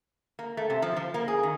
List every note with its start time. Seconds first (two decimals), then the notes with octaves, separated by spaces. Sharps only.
0.39 A#3
0.57 A3
0.70 C3
0.82 F3
0.96 F3
1.14 A#3
1.28 G#4
1.43 D#3